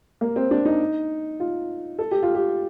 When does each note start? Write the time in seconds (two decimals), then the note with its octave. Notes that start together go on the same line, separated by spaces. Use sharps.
0.21 A#3
0.36 C4
0.51 D4
0.65 D#4
1.40 F4
1.99 A4
2.11 G4
2.23 F4
2.35 G4